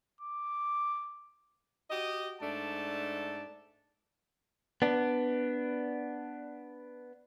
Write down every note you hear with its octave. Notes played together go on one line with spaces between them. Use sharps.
D6
F#4 G4 D#5
G#2 A3 D4 A5
B3 D4